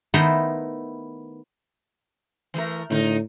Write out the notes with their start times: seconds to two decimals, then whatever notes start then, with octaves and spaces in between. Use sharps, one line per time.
0.14 D#3 A3 B3 E4 C5 A#5
2.54 E3 A3 A#4
2.90 A2 D3 D#4 A#4